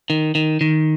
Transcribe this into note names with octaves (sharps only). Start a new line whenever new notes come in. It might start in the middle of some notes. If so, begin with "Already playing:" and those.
D#3
D#3
D#3